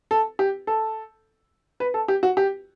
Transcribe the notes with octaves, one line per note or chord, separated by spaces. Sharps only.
A4
G4
A4
B4
A4
G4
F#4
G4